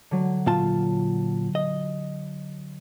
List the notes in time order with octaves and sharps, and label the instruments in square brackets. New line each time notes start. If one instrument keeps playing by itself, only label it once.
[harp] D3 F#3
[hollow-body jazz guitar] A#2 F4 A5
D#5